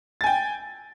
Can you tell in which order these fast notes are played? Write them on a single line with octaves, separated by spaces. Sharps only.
A6 G#5 G5